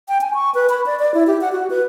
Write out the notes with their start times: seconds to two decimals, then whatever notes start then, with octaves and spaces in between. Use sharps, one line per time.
0.08 G5
0.21 G#5
0.34 C#6
0.55 B4
0.70 B5
0.86 D5
0.99 D5
1.14 E4
1.27 G4
1.41 F#5
1.52 F#4
1.70 B4